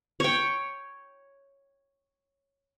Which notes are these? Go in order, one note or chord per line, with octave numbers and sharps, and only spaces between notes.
C#5 G5